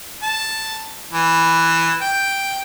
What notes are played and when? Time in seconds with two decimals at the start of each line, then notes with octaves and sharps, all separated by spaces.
0.23 A5
1.13 E3
2.01 G5